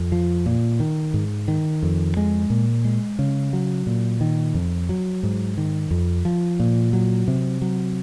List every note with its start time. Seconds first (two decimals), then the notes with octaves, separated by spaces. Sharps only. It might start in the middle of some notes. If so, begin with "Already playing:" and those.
Already playing: F2
0.12 F3
0.46 A#2
0.80 D#3
1.14 G#2
1.48 D#3
1.83 F2
2.17 G#3
2.50 A#2
2.85 G#3
3.19 C#3
3.53 F#3
3.87 A#2
4.21 D#3
4.54 F2
4.89 F#3
5.23 G#2
5.58 D#3
5.91 F2
6.25 F3
6.60 A#2
6.93 F#3
7.28 C3
7.62 F#3